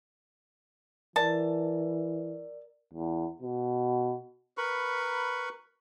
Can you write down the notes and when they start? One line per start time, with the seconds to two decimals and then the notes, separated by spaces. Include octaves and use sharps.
1.16 E3 A#4 D5 A5
2.93 E2
3.42 B2
4.58 A#4 B4 B5 C#6